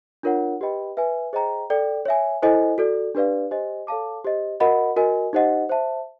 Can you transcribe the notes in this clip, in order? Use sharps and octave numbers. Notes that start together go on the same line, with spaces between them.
D4 F4 A#4 C#5 F#5
G4 B4 D#5 G5 B5
B4 E5 G#5
G#4 C5 D#5 G5 A#5
A4 D5 G5
C#5 E5 G#5
E4 A4 C5 D#5 G#5
F#4 A4 D5
D4 G4 B4 D5 F5
G4 C5 D#5 G#5
A4 C#5 F5 A5 D6
G4 C5 D#5
F#4 A#4 D#5 F#5 B5
F#4 A#4 D#5 G#5
D#4 G4 C5 D#5 F#5
C5 E5 A5